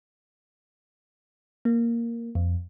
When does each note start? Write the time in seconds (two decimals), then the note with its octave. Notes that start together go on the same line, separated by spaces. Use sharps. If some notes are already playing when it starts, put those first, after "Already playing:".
1.65 A#3
2.35 F2